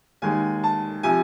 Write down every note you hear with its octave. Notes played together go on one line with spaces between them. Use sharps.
D#2 D#3 G#3 G#5
A5
C3 F3 G#5